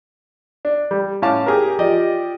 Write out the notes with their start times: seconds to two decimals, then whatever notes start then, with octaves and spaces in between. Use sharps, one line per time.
0.65 D4
0.91 G3
1.22 A2 C#4 F5 A5 D6
1.46 G4 G#4 A#4
1.79 F3 G4 D5 D#5